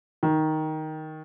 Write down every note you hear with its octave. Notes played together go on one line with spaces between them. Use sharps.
D#3